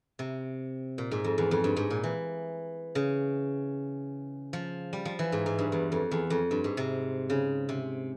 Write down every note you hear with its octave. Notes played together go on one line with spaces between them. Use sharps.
C3
A#2
G#2
F2
E2
F2
G2
G#2
A#2
E3
C#3
F3
G3
F3
E3
G#2
G#2
G2
E2
F2
E2
F2
G2
G#2
C3
C#3
C3